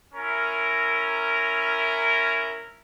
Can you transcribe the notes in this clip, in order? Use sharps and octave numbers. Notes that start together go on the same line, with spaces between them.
C#4 E4 A#4